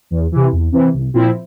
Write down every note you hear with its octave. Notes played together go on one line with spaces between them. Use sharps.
E2
C3 E3
E2
C3 E3
C2
A#2 F3 C4 E4